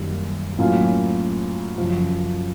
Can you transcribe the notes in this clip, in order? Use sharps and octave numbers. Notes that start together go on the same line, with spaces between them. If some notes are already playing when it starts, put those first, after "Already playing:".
Already playing: F#2 D#3 G3 A#3
A2 F#3 A#3 C#4 F4
F#2 C#3 F3